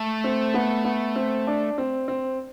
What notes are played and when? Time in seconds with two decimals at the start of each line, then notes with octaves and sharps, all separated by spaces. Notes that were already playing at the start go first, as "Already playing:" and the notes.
Already playing: A3
0.24 C4
0.54 B3
0.85 B3
1.16 C4
1.47 D4
1.78 C4
2.08 C4